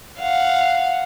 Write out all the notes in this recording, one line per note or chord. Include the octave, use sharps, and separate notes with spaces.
F5 F#5